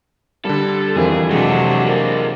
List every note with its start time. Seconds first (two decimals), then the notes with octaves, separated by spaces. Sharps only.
0.45 D3 G3 A4
0.96 F2 D#3 E3 G#4
1.31 C3 F#3 G#3 A3 D4 F#4
1.87 F3 A#3